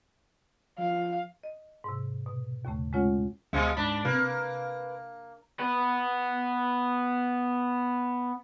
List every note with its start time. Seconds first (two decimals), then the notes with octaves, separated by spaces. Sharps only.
0.79 F3 F5
1.43 D#5
1.84 G#2 C3
2.26 B2
2.65 D#2 A2 C#3 A3
2.93 G#3 A3 C#4 F4 C#5 F#5
3.53 D2 B2 G#3 E5 F5 D#6 A6
3.77 G#2 D4 D5 B5 D6 B6
4.05 C3 A#3 B4
5.60 B3 B4